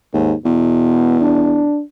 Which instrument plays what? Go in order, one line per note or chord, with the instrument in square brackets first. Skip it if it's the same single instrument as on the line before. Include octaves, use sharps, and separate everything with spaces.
[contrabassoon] D#2 [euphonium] G#2
[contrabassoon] E2 [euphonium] B2
[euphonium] D4